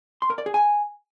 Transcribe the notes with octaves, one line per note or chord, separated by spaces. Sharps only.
C6
A#4
D5
G#4
G#5